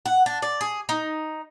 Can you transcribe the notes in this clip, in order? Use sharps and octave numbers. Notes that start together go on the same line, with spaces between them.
F#5
D4
D5
G#4
D#4